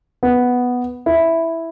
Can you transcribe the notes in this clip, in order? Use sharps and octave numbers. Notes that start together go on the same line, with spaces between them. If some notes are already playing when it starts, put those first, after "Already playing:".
B3
E4